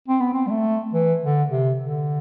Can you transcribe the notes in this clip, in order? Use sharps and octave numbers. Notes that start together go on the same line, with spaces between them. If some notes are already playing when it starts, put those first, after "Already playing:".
C4
B3
C4
G3
A3
E3
D3
C3
D3